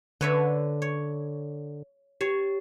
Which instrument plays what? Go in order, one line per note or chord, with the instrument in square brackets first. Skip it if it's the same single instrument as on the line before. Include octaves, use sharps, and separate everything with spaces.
[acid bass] D3 [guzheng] B4 C#5 E5
[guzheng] C#5
[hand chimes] G4 [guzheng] C#5